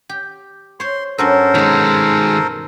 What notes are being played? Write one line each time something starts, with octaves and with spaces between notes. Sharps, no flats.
G4
C5 C#5 C6
G2 F#3 C#4 A4 A#4 C5
B2 D#3 G#3 D#4